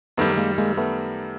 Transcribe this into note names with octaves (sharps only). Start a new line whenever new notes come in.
F#2 D#3 G3 A3 B3
G#3 A#3
G#3 A#3
A3 B3